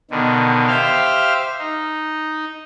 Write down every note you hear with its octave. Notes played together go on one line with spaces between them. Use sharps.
B2 D3 D#3
G4 C5 E5 F5 F6
D#4